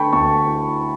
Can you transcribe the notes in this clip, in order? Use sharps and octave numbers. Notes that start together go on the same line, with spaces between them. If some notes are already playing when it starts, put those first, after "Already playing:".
Already playing: D3 A3 G5 A5 B5 C#6
D2 A5 C#6
E4